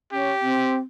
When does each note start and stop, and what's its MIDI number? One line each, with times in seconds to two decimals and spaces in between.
0.12 0.31 61
0.12 0.78 67
0.41 0.76 60